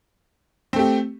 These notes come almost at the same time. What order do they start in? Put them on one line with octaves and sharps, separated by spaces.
C4 A3 G4